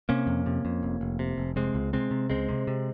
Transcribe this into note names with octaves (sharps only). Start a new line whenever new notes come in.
C3 A#3 C#4
F2
C3
F2
F1
F1
C3
F1
C3 G#3 C4
C#2
C3 G#3 C4
C3
C#2 G#3 C4
C3
C3